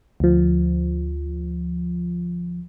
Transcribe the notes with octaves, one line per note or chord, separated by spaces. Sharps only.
D2 F3